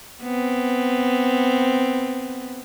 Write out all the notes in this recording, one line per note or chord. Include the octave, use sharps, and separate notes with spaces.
B3 C4